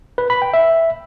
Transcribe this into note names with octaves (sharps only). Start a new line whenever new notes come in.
B4
B5
G5
E5